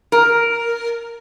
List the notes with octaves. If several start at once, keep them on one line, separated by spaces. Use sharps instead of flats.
A#4